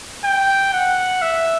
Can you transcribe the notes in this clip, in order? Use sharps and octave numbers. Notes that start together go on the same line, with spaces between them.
G5
F#5
E5